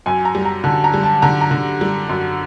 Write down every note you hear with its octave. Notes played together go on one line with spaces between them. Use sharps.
F#2 G#5
A#5
G3
A#5
D3 A5
A#5
G3
A5
D3 A#5
A#5
D3
G3
F#2